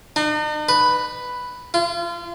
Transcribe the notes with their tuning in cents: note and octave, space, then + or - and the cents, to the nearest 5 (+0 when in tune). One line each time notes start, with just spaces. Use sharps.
D#4 -45
B4 +5
F4 -30